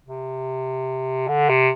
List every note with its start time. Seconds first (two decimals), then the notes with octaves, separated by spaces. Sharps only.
0.07 C3
1.28 D3
1.49 C3